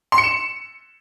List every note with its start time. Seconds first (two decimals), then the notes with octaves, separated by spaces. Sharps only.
0.12 C6
0.18 C#7
0.24 E7